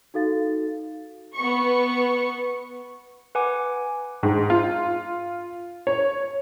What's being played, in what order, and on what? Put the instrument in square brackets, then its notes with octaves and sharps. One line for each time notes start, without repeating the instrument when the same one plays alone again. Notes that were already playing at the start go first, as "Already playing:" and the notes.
[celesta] D#4 F#4 A4 F5 A6
[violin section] B3 C#6
[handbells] B4 F#5 G#5 D6
[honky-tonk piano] G#2
F4
C#5